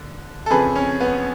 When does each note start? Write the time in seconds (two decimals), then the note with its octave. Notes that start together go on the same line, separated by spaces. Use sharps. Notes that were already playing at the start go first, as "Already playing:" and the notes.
Already playing: D3
0.46 A4
0.50 F2 C#3 G#4 B4
0.75 C#4
1.00 B3